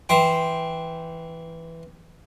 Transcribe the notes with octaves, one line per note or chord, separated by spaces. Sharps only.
E3 C5 G5